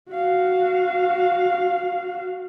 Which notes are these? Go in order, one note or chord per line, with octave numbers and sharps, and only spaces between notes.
F#4 F5